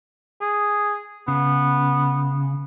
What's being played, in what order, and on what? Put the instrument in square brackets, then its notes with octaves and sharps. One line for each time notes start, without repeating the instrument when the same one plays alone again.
[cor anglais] G#4
[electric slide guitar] C#3 [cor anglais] B3